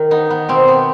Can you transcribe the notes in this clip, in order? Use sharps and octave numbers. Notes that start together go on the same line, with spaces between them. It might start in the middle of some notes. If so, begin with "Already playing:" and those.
Already playing: D#3
B3 D#4
B3
B2 C4
B3